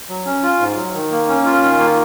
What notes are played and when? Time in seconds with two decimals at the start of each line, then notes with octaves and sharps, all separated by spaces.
0.09 F#3
0.25 C#4
0.43 F4
0.60 G#2
0.76 F#3
0.94 D#3
1.11 A#3
1.28 C#4
1.45 F4
1.62 D#3
1.79 A#3